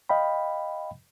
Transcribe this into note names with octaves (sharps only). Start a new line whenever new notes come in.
D#5 F5 G5 B5